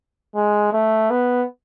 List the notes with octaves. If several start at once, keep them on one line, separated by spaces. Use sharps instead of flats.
G#3
A3
B3